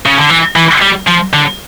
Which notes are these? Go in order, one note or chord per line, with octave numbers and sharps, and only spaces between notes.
C#3
D3
E3
E3
G3
F3
D3